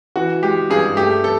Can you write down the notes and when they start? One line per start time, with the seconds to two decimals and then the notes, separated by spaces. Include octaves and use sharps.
0.16 E3 F#4
0.43 G#3 G4
0.70 G2 G#4
0.97 A3 G4
1.24 A4